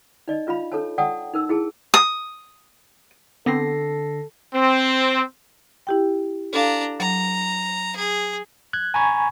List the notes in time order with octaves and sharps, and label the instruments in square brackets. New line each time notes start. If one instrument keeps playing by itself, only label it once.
[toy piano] D#4 D5 D#5
D4 F4 F5 B5
D4 A4 C#5 A5
D5 F#5 G5 A5 D#6
D#4 A#4 E6
E4 G#4 A5
[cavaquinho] D#6
[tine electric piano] D3 A#6 C7 [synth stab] B3 C4 [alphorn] A4
[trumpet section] C4
[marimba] E4 G4 G5
[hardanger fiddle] D4 A#5 [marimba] A4 F5
[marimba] F#3 [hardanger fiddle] A#5
[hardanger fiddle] G#4
[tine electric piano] F#6 G#6
G#5 A#5 B5 C#6 G#6